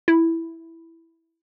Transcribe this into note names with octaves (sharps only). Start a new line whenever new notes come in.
E4